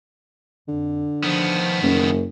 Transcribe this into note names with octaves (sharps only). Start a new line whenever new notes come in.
F2 D3
D#3 F3 B3
F#1 F#2